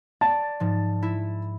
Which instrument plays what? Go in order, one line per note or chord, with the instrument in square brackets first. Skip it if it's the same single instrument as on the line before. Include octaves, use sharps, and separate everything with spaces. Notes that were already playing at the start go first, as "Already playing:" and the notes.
[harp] D5 [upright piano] A5 A6
[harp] G#2 F3
E4